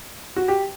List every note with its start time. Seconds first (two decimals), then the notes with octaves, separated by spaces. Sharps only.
0.36 F#4
0.48 G4